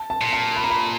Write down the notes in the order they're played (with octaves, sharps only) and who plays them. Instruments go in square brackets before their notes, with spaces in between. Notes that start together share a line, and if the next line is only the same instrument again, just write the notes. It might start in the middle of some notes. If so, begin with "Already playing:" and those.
Already playing: [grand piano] A5
A5
[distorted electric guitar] A#2
[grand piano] A5
B5
A#5
B5